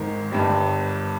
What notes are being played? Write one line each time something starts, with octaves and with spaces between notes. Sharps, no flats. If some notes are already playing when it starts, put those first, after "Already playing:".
Already playing: G#1 G#2 D#3 A#4
G1 G2 G3